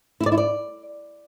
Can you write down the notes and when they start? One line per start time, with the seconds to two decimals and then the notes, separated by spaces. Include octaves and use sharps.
0.20 E4
0.26 D5
0.32 E4
0.38 D5